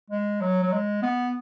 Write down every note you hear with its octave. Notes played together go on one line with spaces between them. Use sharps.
G#3
F#3
F#3
G#3
B3